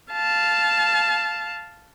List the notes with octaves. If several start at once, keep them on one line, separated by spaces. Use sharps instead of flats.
F5 A5